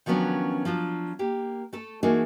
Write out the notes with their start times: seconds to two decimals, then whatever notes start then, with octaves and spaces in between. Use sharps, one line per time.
0.06 D#3 F3 F#3 B3 C#4 D4
0.65 F3 F#3 D4 F4
1.19 A#3 G4
1.73 A3 A4
2.03 E3 A3 A#3 D#4 F#4 G#4